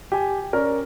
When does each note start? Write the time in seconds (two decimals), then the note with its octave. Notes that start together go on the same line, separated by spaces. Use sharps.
0.12 G4 G#5
0.53 C#4 A#4 D5